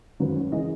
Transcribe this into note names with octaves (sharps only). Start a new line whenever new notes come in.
G#1 F#2 D#3 F#3 B4
C#5
C#3 E3 G#3 D#5